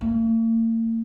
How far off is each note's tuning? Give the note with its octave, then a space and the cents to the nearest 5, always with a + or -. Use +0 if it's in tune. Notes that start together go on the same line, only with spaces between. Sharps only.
A#3 -45